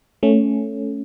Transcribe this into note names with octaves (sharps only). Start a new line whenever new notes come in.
A3 C#4